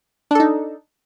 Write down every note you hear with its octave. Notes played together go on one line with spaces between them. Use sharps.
D4 D#4 A4